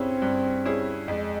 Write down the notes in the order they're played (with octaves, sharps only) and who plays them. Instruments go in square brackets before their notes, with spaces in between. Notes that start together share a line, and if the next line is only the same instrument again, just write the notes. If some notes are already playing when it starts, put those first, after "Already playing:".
Already playing: [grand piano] G2 G3 C#4 E4 G#4 [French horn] C4
[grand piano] G2
G3 C#4 E4 G#4
[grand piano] F2 [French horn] G#3